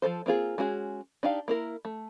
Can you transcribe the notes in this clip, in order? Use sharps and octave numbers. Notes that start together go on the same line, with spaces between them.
F3 F#3 A4 C5
A#3 C4 F4 G#4
G#3 C#4 F#4 G#4
D4 D#4 G4 F5
A#3 E4 A#4
A3